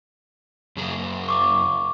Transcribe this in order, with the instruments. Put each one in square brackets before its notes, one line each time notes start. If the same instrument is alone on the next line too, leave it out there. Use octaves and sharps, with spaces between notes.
[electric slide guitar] F#2 C#3 G#4
[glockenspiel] C#6 D6